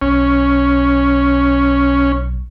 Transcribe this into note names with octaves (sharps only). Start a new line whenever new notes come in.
B1 C#4